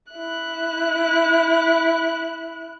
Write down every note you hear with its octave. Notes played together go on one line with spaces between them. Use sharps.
E4 F#6